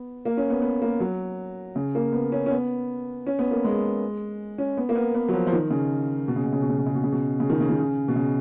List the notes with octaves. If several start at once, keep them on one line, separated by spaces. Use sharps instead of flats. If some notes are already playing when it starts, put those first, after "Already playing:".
Already playing: B3
A#3
C#4
B3
B3
A#3
F#3
C#3
A#3
B3
C#4
C#4
B3
C#4
B3
A#3
G#3
C#4
B3
A#3
B3
B3
F#3
F3
F3
D#3
C#3
B2
C#3
B2
C#3
B2
C#3
B2
C#3
B2
C#3
B2
C#3
D#3
C#3
D#3
C#3
B2
C#3